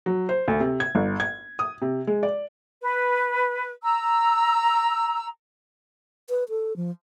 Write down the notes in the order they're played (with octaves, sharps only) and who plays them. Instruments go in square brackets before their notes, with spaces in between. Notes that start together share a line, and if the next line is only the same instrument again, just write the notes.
[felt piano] F#3
C5
D2
C3
G#6
G1
G#6
D#6
C3
G#3
D5
[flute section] B4
A#5 E6
[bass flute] B4
A4
F3